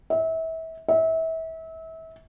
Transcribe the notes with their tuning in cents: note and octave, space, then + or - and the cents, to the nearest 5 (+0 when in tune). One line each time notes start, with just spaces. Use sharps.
E5 -30
E5 -30